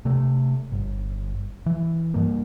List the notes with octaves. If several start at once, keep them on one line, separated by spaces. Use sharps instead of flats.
C3 A3
G1
E3
G2 A#3